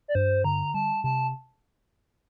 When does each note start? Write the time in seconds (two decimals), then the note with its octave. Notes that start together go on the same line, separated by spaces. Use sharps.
0.08 D5
0.15 G2 C5
0.44 D3 A#5
0.74 G3 A5
1.04 C3 A5